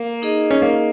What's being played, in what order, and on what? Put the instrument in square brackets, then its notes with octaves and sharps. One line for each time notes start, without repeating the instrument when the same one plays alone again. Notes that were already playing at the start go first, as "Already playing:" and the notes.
Already playing: [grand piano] A#3
[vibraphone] D#4 G#4 D#5
[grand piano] C#4
A#3